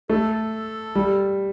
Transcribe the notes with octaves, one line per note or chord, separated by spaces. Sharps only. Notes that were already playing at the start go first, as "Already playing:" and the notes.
A3 A4
A4
G3